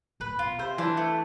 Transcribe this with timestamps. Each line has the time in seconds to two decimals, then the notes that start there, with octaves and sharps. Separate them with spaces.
0.20 A2 B4
0.39 B2 F4
0.58 C3 C5
0.78 E3 D4
0.97 A3